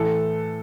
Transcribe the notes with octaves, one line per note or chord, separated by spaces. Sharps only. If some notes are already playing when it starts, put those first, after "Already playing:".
Already playing: A2 E3 A4